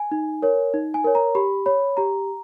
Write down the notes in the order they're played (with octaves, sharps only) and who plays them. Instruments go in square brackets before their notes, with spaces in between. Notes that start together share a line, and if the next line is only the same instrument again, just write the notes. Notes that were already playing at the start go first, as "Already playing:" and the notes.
Already playing: [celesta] G#5
D#4
A#4 C#5
D#4
G#5
A#4 C#5
A#5
G4 B5
C#5 B5
G4 A#5